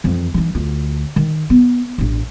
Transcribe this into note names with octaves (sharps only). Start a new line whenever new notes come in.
F2 E3
E3 D#4
D2 F4
D#3
B3
A1 D4